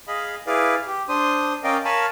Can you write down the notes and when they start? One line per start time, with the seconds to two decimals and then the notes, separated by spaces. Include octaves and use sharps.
0.07 G#4 D#5 F5 B5
0.47 E4 G#4 B4 D5 F5
0.87 G4
1.09 D4 C5 C6 D#6
1.64 C#4 A#4 D5 D#5 F5 G5
1.85 A#4 C#5 F5 G#5 A5 B5